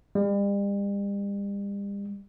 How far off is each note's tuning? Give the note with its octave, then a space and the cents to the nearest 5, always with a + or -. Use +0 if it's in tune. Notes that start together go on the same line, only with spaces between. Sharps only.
G3 +40